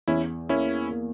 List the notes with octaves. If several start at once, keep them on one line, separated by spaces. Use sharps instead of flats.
E2 C#4 E4
A#3 C#4 E4
A#3